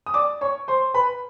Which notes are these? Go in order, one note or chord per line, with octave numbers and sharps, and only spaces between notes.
D#6
D5 D6
C#5 C#6
C5 C6
B4 B5